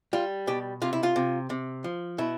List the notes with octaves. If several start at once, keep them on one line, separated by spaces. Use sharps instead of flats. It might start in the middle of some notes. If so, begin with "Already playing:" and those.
G3 F4
B2 G4
C3 F4
E4
F4
C3
C3
F3
B2 E4